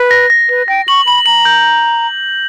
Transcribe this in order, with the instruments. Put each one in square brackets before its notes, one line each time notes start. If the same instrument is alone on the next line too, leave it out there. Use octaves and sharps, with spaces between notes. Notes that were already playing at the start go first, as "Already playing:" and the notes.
Already playing: [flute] B4
[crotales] A#6
A#6
[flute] B4 [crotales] A#6
[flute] G5 [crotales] A#6
[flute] C#6 [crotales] F#7
[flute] B5 [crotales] F#7
[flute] A#5 [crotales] F#7
[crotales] G6